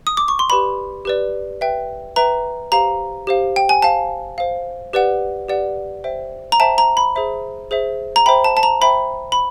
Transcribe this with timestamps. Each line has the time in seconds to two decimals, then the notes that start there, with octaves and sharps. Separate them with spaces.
0.07 D#6
0.17 D6
0.28 C#6
0.39 C6
0.50 G4 B4 D5 B5
1.05 G4 B4 D5
1.61 B4 E5 G5
2.16 B4 E5 G5 A#5
2.72 G4 C5 F5 A#5
3.27 G4 C5 F5
3.56 G5
3.69 G#5
3.82 C5 F5 A5
4.38 C5 F5
4.93 G4 B4 D5 F#5
5.48 G4 B4 D5 F#5
6.04 C5 E5 G5
6.52 A#5
6.60 C5 E5 G5 A5
6.78 A#5
6.97 B5
7.16 G#4 C5 E5
7.71 G#4 C5 E5
8.16 A#5
8.26 C5 E5 G5 B5
8.44 A5
8.57 A5
8.63 A#5
8.81 C5 E5 G5 B5
9.32 B5